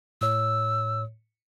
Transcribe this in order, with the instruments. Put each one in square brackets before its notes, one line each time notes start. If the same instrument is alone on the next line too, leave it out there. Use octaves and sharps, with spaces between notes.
[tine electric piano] A2 C#5 [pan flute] E6